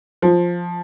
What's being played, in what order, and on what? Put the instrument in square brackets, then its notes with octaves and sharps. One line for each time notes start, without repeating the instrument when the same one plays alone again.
[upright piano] F3